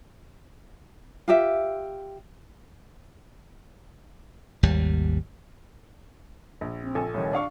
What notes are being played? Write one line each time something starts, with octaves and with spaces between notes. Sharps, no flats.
F4 G4 E5
G#1 D#2 G3
A#1
C4
A#1 A4 G#5
C2 D#3 C#5
D4 F5 C#6